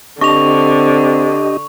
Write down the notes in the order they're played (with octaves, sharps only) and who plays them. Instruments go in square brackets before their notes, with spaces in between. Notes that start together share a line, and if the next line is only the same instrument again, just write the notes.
[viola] D3 [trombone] C4 [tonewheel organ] D4 G4 D#5 [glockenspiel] C#6 F7